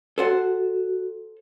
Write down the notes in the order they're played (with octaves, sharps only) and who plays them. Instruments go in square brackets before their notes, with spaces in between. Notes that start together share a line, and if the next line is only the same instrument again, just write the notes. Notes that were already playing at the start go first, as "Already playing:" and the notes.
[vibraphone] F#4 [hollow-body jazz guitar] A4 C5 F#5